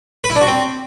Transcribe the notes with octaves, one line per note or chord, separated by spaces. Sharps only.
B4
E4
D4
F#4
C4